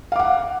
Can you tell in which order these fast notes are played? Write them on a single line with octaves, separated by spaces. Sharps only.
F5 D6 F#5